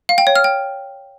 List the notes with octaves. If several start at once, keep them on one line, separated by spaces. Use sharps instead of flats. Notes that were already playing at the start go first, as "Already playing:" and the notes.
F5
G5
C#5
F6
G5